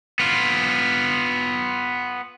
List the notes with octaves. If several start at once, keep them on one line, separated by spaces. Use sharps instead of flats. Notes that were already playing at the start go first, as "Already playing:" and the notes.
B3 F4